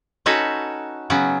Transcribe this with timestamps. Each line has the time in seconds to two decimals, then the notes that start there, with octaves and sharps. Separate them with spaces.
0.26 C#4 D#4 F#4 A4 B4 C#5
1.10 C#3 F#3 B3 C#4